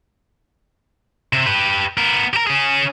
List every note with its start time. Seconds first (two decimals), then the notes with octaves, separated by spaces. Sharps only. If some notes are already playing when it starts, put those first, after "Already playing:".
1.33 C3
1.46 G4 B4
1.97 B3 A#4
2.33 G4 A#4
2.47 C#4 G#4